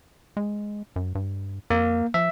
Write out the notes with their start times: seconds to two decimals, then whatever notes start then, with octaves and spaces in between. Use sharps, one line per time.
0.37 G#3
0.96 F#2
1.15 G2
1.70 F2 A#3
2.14 F3 E5